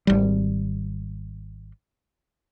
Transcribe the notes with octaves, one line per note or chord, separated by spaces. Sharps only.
G#1 G3